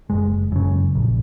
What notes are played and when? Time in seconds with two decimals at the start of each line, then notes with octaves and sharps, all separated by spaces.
0.10 F#1 G#3
0.52 F#2 C#3
0.95 A#1